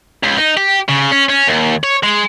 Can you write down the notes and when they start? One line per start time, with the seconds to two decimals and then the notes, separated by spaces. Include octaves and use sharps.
0.23 C#2
0.38 D#4
0.57 G4
0.88 C#3
1.11 C#4
1.29 C#4
1.47 D#2
1.84 C#5
2.03 G#3